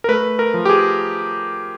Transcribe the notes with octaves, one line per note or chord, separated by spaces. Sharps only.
A#4
A3 B4
A#4
F3
G4
G#4